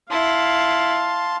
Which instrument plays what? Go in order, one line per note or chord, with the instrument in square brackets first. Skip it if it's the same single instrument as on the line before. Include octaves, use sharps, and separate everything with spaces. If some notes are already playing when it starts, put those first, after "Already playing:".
[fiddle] E4 [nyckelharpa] F5 [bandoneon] A5 C6